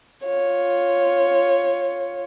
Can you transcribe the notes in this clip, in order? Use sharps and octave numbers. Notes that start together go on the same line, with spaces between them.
F4 C#5